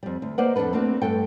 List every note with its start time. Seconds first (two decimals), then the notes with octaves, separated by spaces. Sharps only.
0.03 F2 G3
0.22 D2
0.38 A#3 B4 C5 D5 D#5 F#5
0.56 F2 D4 F4 A4 B4
0.73 A3 A#3 C4 D4 F#4
1.02 G2 A3 A4 G5